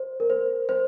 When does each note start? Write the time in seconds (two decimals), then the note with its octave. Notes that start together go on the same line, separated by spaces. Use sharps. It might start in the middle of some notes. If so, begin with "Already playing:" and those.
Already playing: C5
0.20 A#4
0.30 C5
0.69 C5